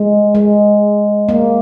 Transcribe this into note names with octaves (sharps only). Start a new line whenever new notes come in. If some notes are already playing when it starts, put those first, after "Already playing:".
Already playing: G#3
G#3
A#3